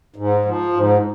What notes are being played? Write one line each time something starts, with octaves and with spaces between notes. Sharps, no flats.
G#2
F3
G#2